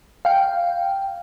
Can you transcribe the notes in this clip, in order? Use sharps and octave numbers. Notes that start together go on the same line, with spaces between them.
F5 G5